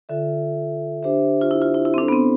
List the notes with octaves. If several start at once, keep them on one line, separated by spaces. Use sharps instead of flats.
D3 F4 A4 E5
D4 G4 C5 E5
F4
E4
F4
E4
E4
C4
D4 E4 A4 C5
B3
C4